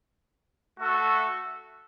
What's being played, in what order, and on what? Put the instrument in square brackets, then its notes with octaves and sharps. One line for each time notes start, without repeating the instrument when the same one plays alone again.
[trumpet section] A3 F#4 A4 E5